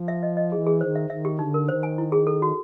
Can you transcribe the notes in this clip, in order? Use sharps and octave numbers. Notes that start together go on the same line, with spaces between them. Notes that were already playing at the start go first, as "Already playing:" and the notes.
Already playing: F3
E5
D#5
D#5
E3 G#4
G#4
D#3 C5
E5
D#3 E5
G4
D3 D#4
A#4
D#3 C5
G#5
E4
G#4
A4
F#4